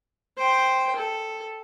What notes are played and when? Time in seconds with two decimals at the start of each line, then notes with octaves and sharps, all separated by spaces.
0.38 C5 G5
0.95 A4